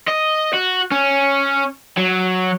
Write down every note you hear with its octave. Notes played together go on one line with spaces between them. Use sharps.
D#5
F#4
C#4
F#3